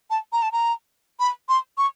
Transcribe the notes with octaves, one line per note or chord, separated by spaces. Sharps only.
A5
A#5
A5
A#5
B5
C6
C#6